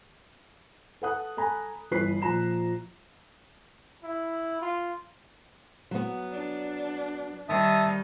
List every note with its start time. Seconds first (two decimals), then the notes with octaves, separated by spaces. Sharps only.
1.02 A4 B4 F#5 D#6 F#6
1.37 A4 G#5 A#5 B5
1.91 G1 E3 B4 F#6 B6 C7
2.22 A#1 F3 A#5 E7
4.04 E4
4.61 F4
5.91 F#3 B3
6.31 D4
7.49 D#3 G3 E5 A5 D#6